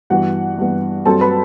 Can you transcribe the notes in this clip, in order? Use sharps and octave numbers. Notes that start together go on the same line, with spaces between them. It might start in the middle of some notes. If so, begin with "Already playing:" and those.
G2 E3 B3 F#4 F#5
G2 E3 B3
G2 F#3 C4 A4 A5
B4 B5